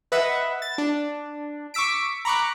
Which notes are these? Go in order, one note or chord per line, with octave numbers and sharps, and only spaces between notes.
B4 D#5 E5 F#5
A6
D4
C#6 D6 E6 B6 D7
A#5 B5 C#6 D6 F#6